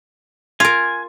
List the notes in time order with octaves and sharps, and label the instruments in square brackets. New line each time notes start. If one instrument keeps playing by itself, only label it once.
[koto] F4 A#4 [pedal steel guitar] G#5